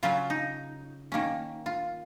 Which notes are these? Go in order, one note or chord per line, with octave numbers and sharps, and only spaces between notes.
C#3 F#3 C#4 F4
D#4
D#3 A#3 C#4
F4